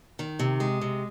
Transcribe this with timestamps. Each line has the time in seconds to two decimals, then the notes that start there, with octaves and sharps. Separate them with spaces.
0.19 D#3
0.39 C3
0.60 G#3
0.81 C3